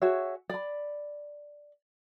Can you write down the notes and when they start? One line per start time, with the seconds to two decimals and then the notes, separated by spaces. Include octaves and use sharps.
0.02 F#4 G#4 C#5 E5
0.50 D5 B5